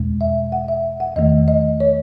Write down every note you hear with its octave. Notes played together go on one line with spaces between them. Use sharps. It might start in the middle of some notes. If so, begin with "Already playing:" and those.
Already playing: E2 B2 G#3
E5
F#5
E5
F#5
E2 D#3 A3 D#5
D#5
C#5